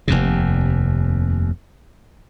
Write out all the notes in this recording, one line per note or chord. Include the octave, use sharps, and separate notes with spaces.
F1 D#2 C3